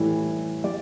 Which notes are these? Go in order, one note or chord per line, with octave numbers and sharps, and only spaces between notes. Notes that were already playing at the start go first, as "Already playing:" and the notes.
Already playing: A2 E3 G3
G3 D5